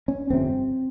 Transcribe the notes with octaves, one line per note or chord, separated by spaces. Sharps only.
C#4
G1 F2 C3 C4